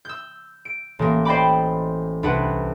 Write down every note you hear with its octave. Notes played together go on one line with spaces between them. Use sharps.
E6 G6
D7
A1 A#3
C5 D5 D#5 G5 B5 D6
C2 D4 B4 F#5